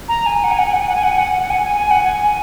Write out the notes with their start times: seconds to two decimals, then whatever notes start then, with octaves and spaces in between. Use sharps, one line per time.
0.08 A#5
0.26 G#5
0.44 F#5
0.51 G#5
0.58 F#5
0.66 G#5
0.73 F#5
0.81 G#5
0.88 F#5
0.95 G#5
1.03 F#5
1.11 G#5
1.18 F#5
1.40 F#5
1.50 G#5
1.63 G#5
1.77 G#5
1.91 F#5
2.04 G#5